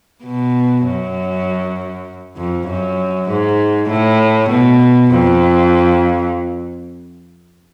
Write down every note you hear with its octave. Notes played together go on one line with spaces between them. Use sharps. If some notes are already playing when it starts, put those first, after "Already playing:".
B2
F#2
F2
F#2
G#2
A2
B2
F2